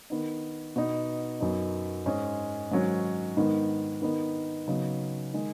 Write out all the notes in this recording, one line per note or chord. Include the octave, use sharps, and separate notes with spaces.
D#3 B3 D#4
B2 B3 D#4
F#2 F#3 B3 D#4
G#2 G#3 C#4
G#2 D#3 F#3 C#4
G#2 D#3 B3 D#4
D#3 B3 D#4
C#3 F#3 B3 D#4
D#3 G#3